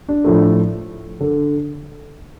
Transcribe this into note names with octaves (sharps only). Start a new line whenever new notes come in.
D4
A2 F3 A3
D3